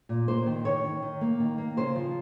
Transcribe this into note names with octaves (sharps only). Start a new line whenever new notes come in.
A#2
A#3 C5
D#3
D#3 C#5
D#3
D#3
A#3
D#3
A#3
C#3 C5
F3